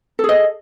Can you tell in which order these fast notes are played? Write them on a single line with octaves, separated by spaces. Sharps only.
A4 G#4 D#5